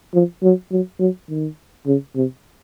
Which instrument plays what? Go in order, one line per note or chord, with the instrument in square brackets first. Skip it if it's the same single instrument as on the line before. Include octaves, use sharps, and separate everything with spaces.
[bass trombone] F3
F#3
F#3
F#3
D#3
C#3
C3